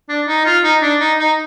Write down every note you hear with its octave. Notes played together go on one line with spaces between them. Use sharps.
D4
D#4
F4
D#4
D4
D#4
D#4